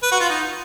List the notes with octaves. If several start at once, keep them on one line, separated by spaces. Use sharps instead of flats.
B4
F#4
F4
D#4